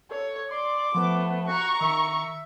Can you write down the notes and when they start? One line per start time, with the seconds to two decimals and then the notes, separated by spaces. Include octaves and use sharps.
0.11 A4 C#5
0.51 D5 C6 D6
0.95 F3 A3 B3
1.48 F#4 A#5 C#6
1.81 D#3 E5